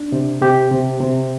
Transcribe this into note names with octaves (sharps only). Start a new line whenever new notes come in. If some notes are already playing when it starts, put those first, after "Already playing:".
Already playing: D4
C3
C3 G4
C3
C3